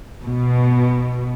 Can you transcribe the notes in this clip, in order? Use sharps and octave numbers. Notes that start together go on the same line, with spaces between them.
B2